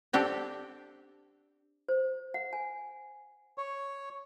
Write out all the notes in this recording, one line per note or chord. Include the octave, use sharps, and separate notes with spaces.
C4 D4 G4 A4
C5
F#5
G#5
C#5